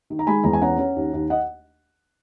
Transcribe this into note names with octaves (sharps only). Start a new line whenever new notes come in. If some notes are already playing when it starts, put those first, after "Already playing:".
D#3
A#5
G#3 G#5 B5
E2 A#5
G#5
C#4 F#5 A#5
C#4
D#2
D#2
D#5 F#5